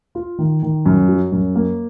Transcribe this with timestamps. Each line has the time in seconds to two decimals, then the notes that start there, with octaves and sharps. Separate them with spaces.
0.15 F4
0.38 D#3
0.63 D#3
0.86 F#2
1.08 F#3
1.32 F#2
1.56 A#3